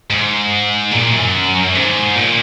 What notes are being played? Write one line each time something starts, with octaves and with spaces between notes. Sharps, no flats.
G#2
A#2
F#2
G#2
A#2